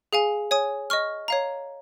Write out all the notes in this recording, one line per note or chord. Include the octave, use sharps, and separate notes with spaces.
G#4 F5 G#5
C#5 G#5 D#6
D#5 C#6 F6
C#5 F5 A#5